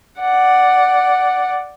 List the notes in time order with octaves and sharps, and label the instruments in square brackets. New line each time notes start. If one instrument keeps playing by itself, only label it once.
[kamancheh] D5 F#5